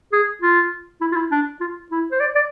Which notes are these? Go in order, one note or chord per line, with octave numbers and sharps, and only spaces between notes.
G#4
F4
E4
F4
E4
D4
F4
E4
C5
D5
D5